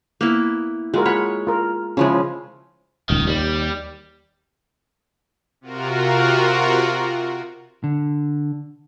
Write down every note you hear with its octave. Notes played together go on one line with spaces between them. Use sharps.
A#3 B3 E4
G#3 F4 F#4 A#4
C#5 F#5 B5
F4 A#4
C#3 F3 G#3 C#4 E4
D#1 C#2 D#3
D#2 G3
C3 F4 F#4 A#4
D3